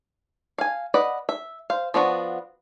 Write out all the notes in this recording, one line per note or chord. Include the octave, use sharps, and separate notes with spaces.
F5 G#5
B4 D5 D#5 F#5 B5
E5
C5 F5
F3 B3 D4 F#4